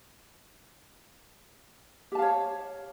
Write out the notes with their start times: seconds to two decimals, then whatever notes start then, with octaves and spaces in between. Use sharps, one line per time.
2.12 G4
2.15 A5
2.19 F5
2.22 C#5